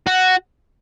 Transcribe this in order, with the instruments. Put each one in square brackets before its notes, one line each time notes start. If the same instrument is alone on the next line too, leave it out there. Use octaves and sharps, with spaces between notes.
[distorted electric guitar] F#4